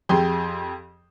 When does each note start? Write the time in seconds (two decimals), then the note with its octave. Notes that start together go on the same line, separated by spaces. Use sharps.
0.09 F2 G4 G#4 G5 C6